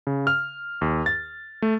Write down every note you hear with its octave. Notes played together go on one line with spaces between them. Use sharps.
C#3
F6
D#2
A6
A3